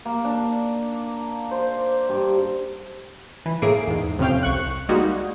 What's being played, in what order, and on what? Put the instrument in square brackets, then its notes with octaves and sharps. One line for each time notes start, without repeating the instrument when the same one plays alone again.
[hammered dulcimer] A#3
D4
C5
G2
[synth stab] E3
A2 A3 A#3 G#4 C7 D7
E2 G#2
F2 A2 C3 C#4 F5 G5
C2 C#6 F#6
G3 G#3 A#3 D#4 F#4